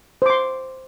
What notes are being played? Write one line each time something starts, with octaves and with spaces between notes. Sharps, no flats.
C5 C6 D6